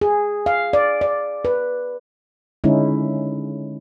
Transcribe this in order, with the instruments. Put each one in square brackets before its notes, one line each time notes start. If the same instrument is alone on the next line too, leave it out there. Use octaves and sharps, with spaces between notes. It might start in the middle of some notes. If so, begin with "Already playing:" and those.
[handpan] G#4
F5
D5
D5
B4
D3 G#3 C#4 D#4 E4